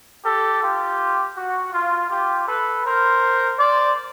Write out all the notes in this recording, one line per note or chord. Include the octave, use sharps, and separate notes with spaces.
G4 A4
F4 G4
F#4
F4
F4 G4
A4 B4
A#4 C5
C5 D5